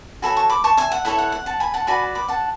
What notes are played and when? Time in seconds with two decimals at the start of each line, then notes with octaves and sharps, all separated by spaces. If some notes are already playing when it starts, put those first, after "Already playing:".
0.22 F#4 A4 C#5 G#5 B5
0.37 A5 C#6
0.50 B5 D6
0.64 A5 C#6
0.77 E5 G#5
0.92 F#5
1.05 E4 A4 C#5 E5
1.18 F#5
1.32 F#5
1.46 F#5 A5
1.60 G#5 B5
1.74 F#5 A5
1.87 F#4 B4 D5 G#5 B5
2.15 B5 D6
2.28 F#5 A5